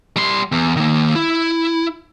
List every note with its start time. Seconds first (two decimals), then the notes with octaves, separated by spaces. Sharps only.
0.16 G3 C6
0.52 E2
0.77 D#3 A#3
1.15 E4